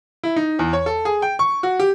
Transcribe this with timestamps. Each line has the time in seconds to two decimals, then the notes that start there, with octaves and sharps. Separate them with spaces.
0.23 E4
0.36 D#4
0.59 E2
0.73 C#5
0.86 A4
1.05 G#4
1.22 G5
1.39 C#6
1.63 F#4
1.80 G4